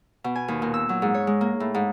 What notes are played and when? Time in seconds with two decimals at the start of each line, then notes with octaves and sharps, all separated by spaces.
0.24 B2
0.36 G#5
0.48 D#2
0.62 A#2
0.74 E6
0.89 F#3
1.02 G#2
1.14 C#5
1.27 G#3
1.41 A#3
1.60 A2
1.74 G#2